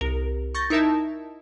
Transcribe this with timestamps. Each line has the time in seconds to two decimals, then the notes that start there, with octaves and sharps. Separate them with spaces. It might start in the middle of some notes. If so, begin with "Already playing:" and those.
0.01 C2 A#4
0.55 C#6 G6 A6 A#6
0.70 D#4 E4 A#4 E5 A5